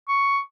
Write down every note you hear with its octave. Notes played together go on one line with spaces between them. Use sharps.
C#6